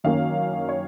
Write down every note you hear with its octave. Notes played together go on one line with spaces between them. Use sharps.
F#2 D#3 A#3 C#4 F5
C#5